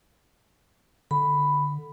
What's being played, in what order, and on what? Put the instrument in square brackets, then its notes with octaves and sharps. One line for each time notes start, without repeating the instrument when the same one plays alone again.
[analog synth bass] D3 [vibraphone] B5